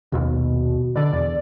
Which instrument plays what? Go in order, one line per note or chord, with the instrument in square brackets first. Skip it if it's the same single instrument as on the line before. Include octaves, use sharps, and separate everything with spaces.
[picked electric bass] D#1 A#1 D#2 [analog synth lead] B2
[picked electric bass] B2 D3 [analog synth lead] D5
[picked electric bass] E2